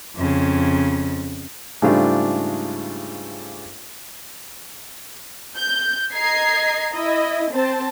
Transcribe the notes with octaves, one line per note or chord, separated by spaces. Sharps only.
F2 C#3
G#2 C#3 G3 A3 D4 F4
G6
D#5 A#5 G#6 C7
E4 D#5
C4 C5 A5